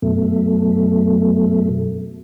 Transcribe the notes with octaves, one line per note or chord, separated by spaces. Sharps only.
F#2 B2 A3